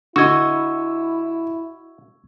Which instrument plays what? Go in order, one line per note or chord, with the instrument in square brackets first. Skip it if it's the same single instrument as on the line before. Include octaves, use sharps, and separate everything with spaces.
[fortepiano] D3 [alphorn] E4 [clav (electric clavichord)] F#4 D#5 [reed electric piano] C#6 E6 G#6